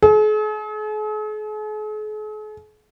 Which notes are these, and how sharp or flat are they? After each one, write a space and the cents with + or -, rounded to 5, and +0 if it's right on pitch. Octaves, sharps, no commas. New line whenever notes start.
G#4 +45